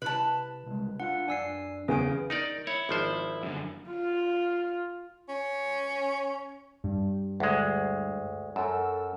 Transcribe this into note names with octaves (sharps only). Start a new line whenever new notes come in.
C3 E4 B4 A5
C2 G#3
D4 F4 F5 F#5
F#2 D4 D5 G#5 E6 C7
E2 C#3 G#4 G#5 D7
D#4 A#4 D5
E4 C#5
G#1 F3 C5
F#2 D3
F4
C#4
G2
D2 G#3
F#2 A4 E6